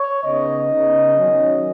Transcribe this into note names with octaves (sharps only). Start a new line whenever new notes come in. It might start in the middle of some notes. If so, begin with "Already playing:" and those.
Already playing: C#5
C#3 B3 D#4 D#5
C#3 B3 D#4
D#3 F#3 C#4